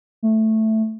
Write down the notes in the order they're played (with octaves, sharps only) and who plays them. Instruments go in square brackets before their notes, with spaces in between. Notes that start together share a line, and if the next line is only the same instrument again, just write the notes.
[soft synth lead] A3